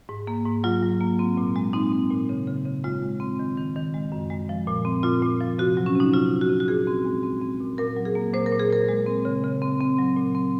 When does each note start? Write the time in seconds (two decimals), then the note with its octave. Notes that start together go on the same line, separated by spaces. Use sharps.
0.09 G#2
0.27 A#3
0.45 G#2
0.64 F#3 F4
0.82 F#3
1.01 A#3
1.19 C4
1.37 A#2
1.56 G#3
1.73 C4 D#4
1.92 C4
2.10 A#2
2.29 C#3
2.47 C#3
2.65 C#3
2.84 G#3 F4
3.02 G#3
3.20 C4
3.39 D#3
3.58 D#3
3.76 D#3
3.94 G#3
4.12 F#2
4.30 G#3
4.49 F3
4.67 A#2
4.85 C4
5.03 A#2 F4
5.22 A#2
5.41 F3
5.59 C3 F#4
5.77 F#3
5.86 C#4
5.95 C3 D#4
6.13 C3 F4
6.32 C3
6.41 F#4
6.50 C3
6.60 F#4
6.68 A#2 G#4
6.87 C4
7.05 G#3
7.23 C4
7.42 C4
7.60 A#2
7.78 A#2 A#4
7.96 F#3
8.05 G#4
8.15 A#3
8.33 A#2 C5
8.46 A#4
8.52 A#2
8.60 G#4
8.70 A#2 A#4
8.88 G#3
9.06 C4
9.25 C#3
9.43 C#3
9.62 C4
9.80 C4
9.98 F#3
10.16 A#2
10.35 C4